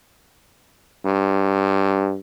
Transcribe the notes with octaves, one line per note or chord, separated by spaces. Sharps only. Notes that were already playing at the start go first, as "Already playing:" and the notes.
G2